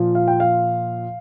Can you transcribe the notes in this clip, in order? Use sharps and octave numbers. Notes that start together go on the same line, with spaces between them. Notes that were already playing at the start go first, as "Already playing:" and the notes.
Already playing: A#2 F3
F5
G5
F5